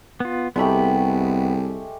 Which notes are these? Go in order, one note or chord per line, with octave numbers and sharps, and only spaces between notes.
B3 F4
C2 G#3 A3 B3 G4 B5